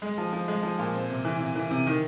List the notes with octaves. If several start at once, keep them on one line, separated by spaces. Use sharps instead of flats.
G#3
F3
F3
G#3
F3
A#2
C4
C3
E3
C3
E3
C3
D#3